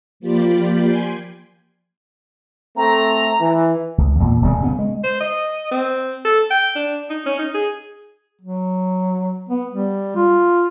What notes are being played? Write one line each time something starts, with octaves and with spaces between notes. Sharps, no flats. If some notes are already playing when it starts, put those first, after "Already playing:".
F3 A#3 F4 G4 D5 B5
G5 G#5 C6
A3 C4 A#5
E3
C#2
E2 A#2
D1 B2 G3
C#3 B3
G#3
C5
D#5
C4
A4
G5
D4
D#4
C#4
D#4
G#4
F#3
B3
G3
F4